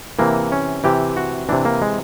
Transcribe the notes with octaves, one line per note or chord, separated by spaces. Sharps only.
C3 E3 A#3
C#4
C3 E3 G4
F#4
C3 E3 D4
A#3
G#3